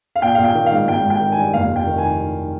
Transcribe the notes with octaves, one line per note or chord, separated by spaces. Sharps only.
F5
A#1 G5
A#1 F5
G5
D#3
F5
G#2
G#1 G5
G#1
G5
D#3
G2 G#5
F1 F5
F1
G5
D#3
G#5